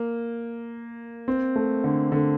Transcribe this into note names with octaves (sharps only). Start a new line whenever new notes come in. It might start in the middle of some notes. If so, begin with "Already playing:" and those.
Already playing: A#3
C4
A3
D3
D3